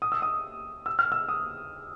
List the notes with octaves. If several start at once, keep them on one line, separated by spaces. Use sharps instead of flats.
D#6
E6
D#6
E6
F6
E6
D#6